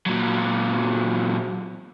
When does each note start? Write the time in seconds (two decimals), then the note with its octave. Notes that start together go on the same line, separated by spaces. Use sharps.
0.06 A#2 F#3